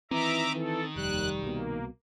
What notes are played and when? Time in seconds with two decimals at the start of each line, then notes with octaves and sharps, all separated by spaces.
0.11 D#3 E3 C4 E5 A#5 D6
0.55 E3 A4
0.96 F1 D#2 G3 F#6
1.43 C2 B2 A#3